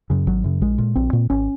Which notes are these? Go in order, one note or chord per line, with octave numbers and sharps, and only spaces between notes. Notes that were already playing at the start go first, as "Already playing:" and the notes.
F#2 C#3
G#1 F#3
F#2 C#3
A#1 G#3
A#2
A#1 C4
A#2
G#1 C#4